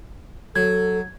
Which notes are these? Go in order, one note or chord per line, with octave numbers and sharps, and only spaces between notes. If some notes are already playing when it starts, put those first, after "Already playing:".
F#3 A4 G#6